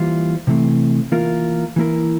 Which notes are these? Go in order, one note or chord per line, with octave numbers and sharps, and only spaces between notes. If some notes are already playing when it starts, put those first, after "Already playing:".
Already playing: E3 G3 A#3 F4 C5
C3 E3 A3 C4
E3 A#3 F4 A#4
E3 A#3 E4 A#4